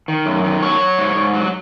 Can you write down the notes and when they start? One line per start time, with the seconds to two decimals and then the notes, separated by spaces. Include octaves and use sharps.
0.08 D#3
0.26 F#2
0.44 D#3
0.62 F#3 C#5
0.80 F#3
0.98 G#2
1.15 G#2
1.34 F#3